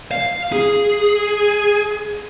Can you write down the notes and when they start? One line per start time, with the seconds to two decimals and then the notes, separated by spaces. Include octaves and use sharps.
0.11 F5
0.52 G#4